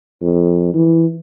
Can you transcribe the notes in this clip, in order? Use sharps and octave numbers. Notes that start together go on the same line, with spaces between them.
F2
E3